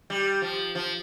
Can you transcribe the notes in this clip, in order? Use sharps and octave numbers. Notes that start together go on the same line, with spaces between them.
G3
F3
F3